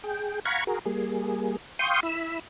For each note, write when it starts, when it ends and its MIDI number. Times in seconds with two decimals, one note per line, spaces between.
0.04 0.40 68
0.04 0.40 79
0.45 0.64 77
0.45 0.64 78
0.45 0.64 82
0.45 0.64 83
0.45 0.64 85
0.45 0.64 92
0.67 0.79 66
0.67 0.79 68
0.67 0.79 70
0.86 1.57 55
0.86 1.57 58
0.86 1.57 68
1.79 2.00 77
1.79 2.00 79
1.79 2.00 84
1.79 2.00 85
1.79 2.00 87
1.79 2.00 91
2.03 2.39 64
2.03 2.39 83
2.03 2.39 88